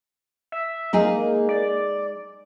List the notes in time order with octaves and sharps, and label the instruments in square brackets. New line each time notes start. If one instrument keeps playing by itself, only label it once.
[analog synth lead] E5
[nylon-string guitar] G#3 D#4 G#4 [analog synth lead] A#3
[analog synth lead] D5